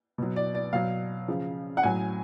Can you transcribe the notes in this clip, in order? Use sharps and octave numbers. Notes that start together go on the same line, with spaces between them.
B2 F#3
D5
D5
B2 F#3 F5
C#3 F3
F#5
A2 F#3 G#5